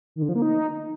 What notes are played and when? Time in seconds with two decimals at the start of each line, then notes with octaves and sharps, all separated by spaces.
0.16 D#3
0.22 D3
0.29 F3
0.35 A#3
0.42 D#4